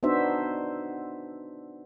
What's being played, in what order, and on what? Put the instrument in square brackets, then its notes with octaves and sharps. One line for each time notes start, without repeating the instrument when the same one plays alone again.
[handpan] B3 D4 D#4 F#4 C5 E5